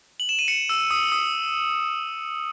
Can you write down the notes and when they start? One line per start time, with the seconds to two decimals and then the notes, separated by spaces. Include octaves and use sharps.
0.20 F#7
0.29 E7
0.39 D#7
0.48 C#7
0.69 E6
0.91 D#6
1.12 D#6